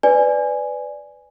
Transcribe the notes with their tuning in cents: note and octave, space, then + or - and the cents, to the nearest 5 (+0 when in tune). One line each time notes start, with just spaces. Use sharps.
B4 +15 D5 +0 G#5 +0